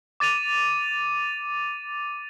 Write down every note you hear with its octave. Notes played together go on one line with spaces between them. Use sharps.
D6 A6 D#7 F7